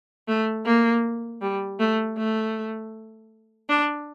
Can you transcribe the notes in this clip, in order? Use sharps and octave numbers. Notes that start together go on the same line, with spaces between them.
A3
A#3
G3
A3
A3
D4